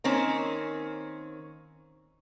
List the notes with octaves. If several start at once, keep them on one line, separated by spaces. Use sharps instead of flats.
D#3 A#3 C4 C#4